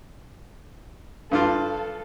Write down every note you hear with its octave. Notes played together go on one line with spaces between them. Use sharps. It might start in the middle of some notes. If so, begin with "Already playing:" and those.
G2 D4 F4 A4